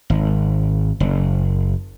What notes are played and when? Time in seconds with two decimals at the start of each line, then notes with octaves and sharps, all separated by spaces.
0.10 G#1
1.00 F#1